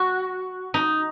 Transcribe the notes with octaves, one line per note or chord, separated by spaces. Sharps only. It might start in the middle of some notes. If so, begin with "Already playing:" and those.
Already playing: F#4
D#4